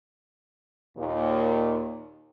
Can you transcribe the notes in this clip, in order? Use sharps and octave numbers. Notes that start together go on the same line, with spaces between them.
D#2 A#2